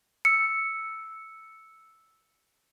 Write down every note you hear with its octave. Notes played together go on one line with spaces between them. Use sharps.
E6 C#7